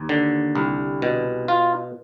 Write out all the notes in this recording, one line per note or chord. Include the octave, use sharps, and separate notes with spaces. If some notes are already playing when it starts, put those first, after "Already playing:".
Already playing: D#2
D3
C2
B2
F4